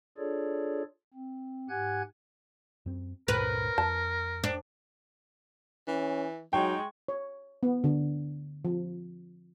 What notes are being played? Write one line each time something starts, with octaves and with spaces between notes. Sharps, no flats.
D4 F4 G#4 A4 C#5 D5
C4
G#2 G4 F#5 G#5 F#6 G#6
F#2 C4
C#2 G2 A#2 A#4 B4
F2 A5
D4
E3 C#4
F#3 G#3 D#4 G5 C#6
C#5
B3
D3
F3